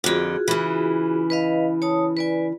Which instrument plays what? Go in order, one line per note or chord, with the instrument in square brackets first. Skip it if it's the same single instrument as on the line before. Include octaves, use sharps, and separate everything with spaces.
[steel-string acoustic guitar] F2 D3 [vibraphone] F4 F#4 G#4
[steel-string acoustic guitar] C#3 E3
[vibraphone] B4 D#5 F5
C#5 A5 D#6
B4 D5 G#5